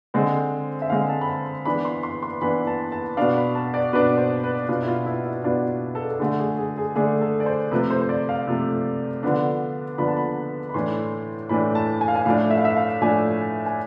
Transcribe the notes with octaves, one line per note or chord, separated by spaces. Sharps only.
D3 G#3 C4 C5
E5
D3 G#3 C4 F5
A5
B5
A5
E3 B3 D4 B5
C6
C6
C6
E3 B3 D4 B5
A5
A5
B2 B3 D4 F5
B5
A5
D5
B2 B3 D4 B4
C5
B4
B2 B3 D4 F4
E4
F4
E4
E4
B2 B3 D4 F4
A4
A4
D3 A3 D4 G#4
G#4
G#4
G#4
D3 A3 D4 G#4
A4
D5
C5
C3 F3 A3 B4
C5
C5
D5
F5
C3 F3 A3
D3 F3 B3 D4
D3 F3 B3 D4 B5
A5
B5
B5
A2 E3 A3 D4 C6
A2 E3 A3 D4 B5
A5
G#5
F5
G#5
A2 F3 A3 D4 F5
E5
F5
E5
F5
A2 F3 A3 D4 G#5
G#5